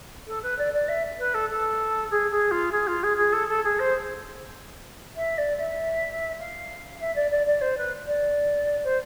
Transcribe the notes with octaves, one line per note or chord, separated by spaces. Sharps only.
A4
B4
D5
D5
E5
B4
A4
A4
G#4
G#4
F4
G#4
F4
G#4
G#4
A4
A4
G#4
C5
E5
D5
E5
F5
E5
D5
D5
D5
C5
B4
D5
C5